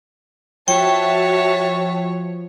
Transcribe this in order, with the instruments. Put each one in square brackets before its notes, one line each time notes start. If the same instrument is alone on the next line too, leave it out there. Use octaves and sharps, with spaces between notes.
[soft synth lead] F3 [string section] F#4 E5 A5 [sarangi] C#5 [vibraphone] G5